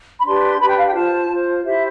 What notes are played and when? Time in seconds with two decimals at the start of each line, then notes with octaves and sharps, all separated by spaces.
0.19 B5
0.25 D4 G4 B4 C6
0.60 D4 G4 B4 B5
0.68 G5
0.76 F5
0.86 G5
0.94 F4 C5 A5
1.29 F4 C5
1.64 E4 G4 C5 E5